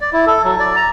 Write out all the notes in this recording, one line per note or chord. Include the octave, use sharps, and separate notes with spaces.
D5
E4
A4
F#3
D5
A#5